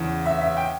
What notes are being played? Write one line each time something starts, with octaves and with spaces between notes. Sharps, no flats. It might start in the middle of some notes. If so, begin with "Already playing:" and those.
Already playing: E2 C#3 E3
E5
E5
G5